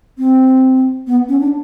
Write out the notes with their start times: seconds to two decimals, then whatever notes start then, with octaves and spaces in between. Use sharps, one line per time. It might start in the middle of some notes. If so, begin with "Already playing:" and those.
0.18 C4
1.07 B3
1.29 C#4
1.40 D4